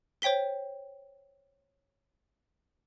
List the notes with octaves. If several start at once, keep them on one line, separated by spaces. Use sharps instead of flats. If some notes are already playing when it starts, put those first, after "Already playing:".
C5 C#5 G5 B6 G7